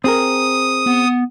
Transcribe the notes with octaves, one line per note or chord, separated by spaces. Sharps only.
C4 G#4 A#4 D#6
B3